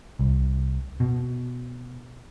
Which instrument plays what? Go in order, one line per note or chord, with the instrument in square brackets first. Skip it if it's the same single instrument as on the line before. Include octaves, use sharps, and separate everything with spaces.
[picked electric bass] C2
B2